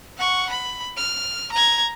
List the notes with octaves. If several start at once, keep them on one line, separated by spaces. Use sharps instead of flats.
F#5 C#6
B5
F6
A#5 G#6